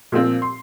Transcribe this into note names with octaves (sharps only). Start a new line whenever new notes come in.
A#2 F3 C4 F4
C6